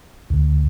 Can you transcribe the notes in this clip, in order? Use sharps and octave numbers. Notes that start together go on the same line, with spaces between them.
D2